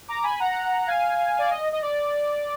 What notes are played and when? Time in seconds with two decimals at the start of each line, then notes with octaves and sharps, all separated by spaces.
0.08 A#5 D6
0.23 G#5 B5
0.39 F#5 A#5
0.86 F5 G#5
1.39 D5
1.50 D#5
1.72 D#5
1.81 D5